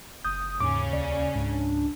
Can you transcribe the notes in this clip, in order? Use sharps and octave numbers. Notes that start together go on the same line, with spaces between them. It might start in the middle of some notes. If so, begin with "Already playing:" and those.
F#1 D#6 G6
D#2 G#2 C#3 C#4 D6
C#2 D5
C#2 G#2 D4